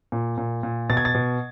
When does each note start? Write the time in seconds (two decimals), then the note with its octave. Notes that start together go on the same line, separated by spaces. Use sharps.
0.12 A#2
0.38 A#2
0.63 A#2
0.90 B2 A6
0.97 G#6
1.05 A6
1.15 B2